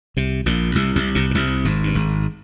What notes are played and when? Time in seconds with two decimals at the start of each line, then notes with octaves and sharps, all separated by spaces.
0.17 C2 C3
0.46 A#1 A#2
0.75 C2 C3
0.96 C2 C3
1.15 C2 C3
1.31 A#2
1.35 C2 C3
1.65 G#1 G#2
1.84 G2
1.95 G#1 G#2